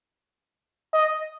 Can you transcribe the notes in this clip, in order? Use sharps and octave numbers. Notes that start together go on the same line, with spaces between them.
D#5